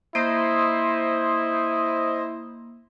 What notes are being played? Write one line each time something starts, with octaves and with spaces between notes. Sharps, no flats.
A#3 E4 C5 D#5